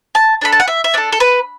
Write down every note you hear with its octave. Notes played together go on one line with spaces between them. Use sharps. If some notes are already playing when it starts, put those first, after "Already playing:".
A5
D4 A4 B5
A5
F#5
E5
E5
D4 A4 D5
A4
B4